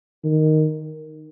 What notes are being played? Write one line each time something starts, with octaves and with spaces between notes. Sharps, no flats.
D#3